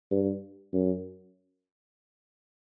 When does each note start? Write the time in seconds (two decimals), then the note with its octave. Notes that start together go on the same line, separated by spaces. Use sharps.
0.11 G2
0.73 F#2